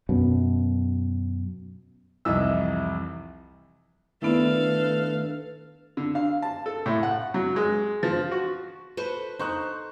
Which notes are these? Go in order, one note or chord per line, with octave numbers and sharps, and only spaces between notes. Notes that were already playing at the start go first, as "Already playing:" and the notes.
F#2 B2
C2 F2 E3 D#4 E5 E6
D#3 A3 B3 D4 E4 A4 B4 F5
D3
F5
A5
A4
A2
F#5
F#3
G#3
F3
F#4
A4 B4 C5 C#6
D#4 C5 C#6 F#6